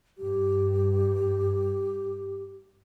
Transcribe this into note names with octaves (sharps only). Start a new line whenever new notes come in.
G2 G4